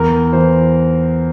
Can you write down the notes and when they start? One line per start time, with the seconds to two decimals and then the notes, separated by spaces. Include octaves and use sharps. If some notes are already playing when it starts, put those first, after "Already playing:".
Already playing: E2 A#4
0.33 E3 C5